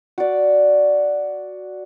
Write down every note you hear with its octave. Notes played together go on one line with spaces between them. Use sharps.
F#4 D5